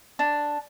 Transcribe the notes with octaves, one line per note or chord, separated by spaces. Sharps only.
D4